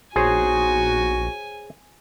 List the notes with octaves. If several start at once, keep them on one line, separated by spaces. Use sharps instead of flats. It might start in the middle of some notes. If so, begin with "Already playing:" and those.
A#1 B3 D#4 F#4 G#4 C5 C#5 G#5